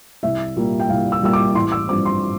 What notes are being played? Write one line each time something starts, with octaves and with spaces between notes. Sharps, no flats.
C2 E5
A#2 G3 A#3
G5
C2 F5
E6
A#2 G3 A#3 E6
D6
A1 C6
E6
G2 F3 C4 D6
C6